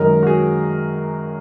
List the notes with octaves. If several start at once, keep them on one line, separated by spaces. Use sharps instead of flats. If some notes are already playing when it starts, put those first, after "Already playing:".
Already playing: F#2 D#3 G#3 A#4
F#4
G#4